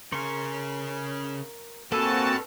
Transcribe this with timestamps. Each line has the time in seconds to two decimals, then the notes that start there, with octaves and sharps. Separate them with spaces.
0.12 C#3 G#4 A#4 C6 C#6
1.92 A#3 C4 F#4 G4 A4 B4 G#5 A5